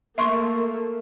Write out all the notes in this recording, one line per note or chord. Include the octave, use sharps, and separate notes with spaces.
A3 A#3 E5 C6 C#6